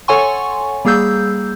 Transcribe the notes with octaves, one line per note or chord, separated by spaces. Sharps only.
A4 C#5 F#5 G#5 C6 C#6
G3 A#3 G#4 E6 G6